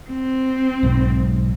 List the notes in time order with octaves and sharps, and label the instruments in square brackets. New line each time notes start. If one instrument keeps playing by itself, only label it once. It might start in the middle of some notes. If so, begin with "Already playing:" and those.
[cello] C4
[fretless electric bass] B1 G#2